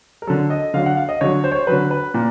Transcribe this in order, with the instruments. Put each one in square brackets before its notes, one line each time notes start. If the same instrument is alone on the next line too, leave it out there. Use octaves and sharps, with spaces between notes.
[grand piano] A#4
D3 F#3 A4
D#5
D3 F#3 F5
F#5
F5
D#5
D3 F#3 C#5
C5
C#5
C5
D3 F#3 B4
B4
A#2